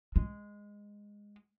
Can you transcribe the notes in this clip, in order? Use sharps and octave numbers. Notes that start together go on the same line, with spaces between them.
G#3